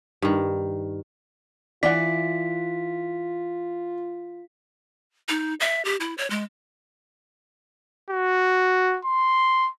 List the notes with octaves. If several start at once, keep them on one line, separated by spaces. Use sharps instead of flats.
G2 D#3
E3 F4 D5 F#5 B6
D#4
E5
G4
E4
C#5
G#3
F#4
C6